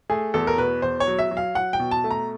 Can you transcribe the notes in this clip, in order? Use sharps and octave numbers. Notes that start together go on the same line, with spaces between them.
A3 G#4
E2 A4
A#4
B2 B4
E2 C5
C#5
F#3
E5
F#3
F5
F#3 F#5
G5
B2
A5
A3
A#5